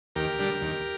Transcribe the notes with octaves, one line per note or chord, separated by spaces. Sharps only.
D#2 G4 A#4
D3 G3
D#2